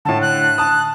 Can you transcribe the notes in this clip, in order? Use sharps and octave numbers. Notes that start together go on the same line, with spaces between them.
A2 D3 A5
F#6
A5 D#6